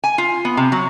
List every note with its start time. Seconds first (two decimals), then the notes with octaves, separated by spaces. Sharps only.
0.04 G#5
0.18 F4
0.45 B3
0.57 C3
0.72 F#3